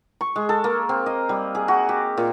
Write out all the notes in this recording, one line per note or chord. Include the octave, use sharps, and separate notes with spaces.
C#6
G#3
A4
A#3
C4
D#5
G3
G#4
F#4
G4
A#2